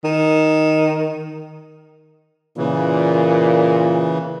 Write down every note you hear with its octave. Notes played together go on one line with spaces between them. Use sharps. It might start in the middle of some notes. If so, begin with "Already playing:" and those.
D#3
A#2 C#3 E3